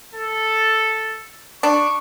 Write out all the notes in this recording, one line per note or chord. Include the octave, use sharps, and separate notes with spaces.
A4
D4 C#6